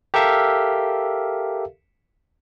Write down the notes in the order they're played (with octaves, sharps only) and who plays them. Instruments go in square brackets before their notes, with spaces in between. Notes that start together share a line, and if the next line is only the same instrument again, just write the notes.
[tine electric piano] G4 A4 A#4 E5 F5